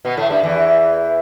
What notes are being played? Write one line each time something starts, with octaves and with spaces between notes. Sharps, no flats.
B2 B3
A2 A3
G2 G3
E2 E3